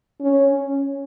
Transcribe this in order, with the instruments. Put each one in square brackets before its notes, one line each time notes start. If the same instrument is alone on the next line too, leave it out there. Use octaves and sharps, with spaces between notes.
[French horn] C#4